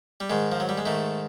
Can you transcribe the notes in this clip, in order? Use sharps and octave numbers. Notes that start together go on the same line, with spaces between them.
G3
G#2 D#3 G#3
F3
F#3
G3
G#3
G#2 D#3 A3